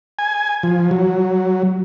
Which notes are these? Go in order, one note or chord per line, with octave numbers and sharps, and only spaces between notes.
G#5
F3
F#3